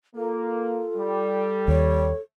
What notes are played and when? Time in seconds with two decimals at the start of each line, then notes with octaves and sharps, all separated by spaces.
0.16 A#3 F4 A4
0.97 G3
1.68 D#2 C#5